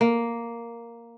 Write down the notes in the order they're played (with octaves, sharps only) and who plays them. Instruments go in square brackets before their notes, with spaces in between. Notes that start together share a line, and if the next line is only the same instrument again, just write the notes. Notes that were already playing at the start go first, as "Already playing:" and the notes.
[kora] A#3